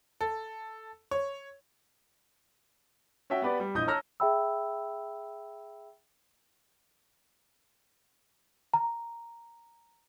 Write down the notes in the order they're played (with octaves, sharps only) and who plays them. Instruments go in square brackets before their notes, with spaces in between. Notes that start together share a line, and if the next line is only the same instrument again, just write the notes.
[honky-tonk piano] A4
C#5
[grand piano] C#4 F#4 E5 G5
B3 G4 B4 D5
G3
A#1 E3 D#5 D#6 G6
C#5 A5 A#5 E6 F6 A#6
[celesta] G#4 E5 G5 B5 E6
A#5